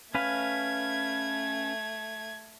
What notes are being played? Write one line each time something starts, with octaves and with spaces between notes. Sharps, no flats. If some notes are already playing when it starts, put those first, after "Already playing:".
A3 C#4 B4 F5 G#6